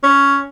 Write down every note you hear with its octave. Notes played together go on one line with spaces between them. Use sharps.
C#4